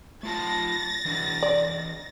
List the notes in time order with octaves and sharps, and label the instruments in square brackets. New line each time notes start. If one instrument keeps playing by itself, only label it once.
[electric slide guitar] A3 F4 A5 [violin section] A6 A#6
[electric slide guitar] E3 D4
[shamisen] D5